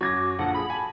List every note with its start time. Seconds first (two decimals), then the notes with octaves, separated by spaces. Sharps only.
0.01 F#2 F#4 D6 G#6 A#6
0.39 A#1 D3 F3 F#5 A5
0.54 G#4 B5
0.70 G#5 A5